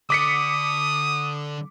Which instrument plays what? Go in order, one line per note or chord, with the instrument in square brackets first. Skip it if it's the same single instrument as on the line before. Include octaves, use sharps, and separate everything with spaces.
[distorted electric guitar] D3 [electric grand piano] D6 B6 C#7 [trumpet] D#6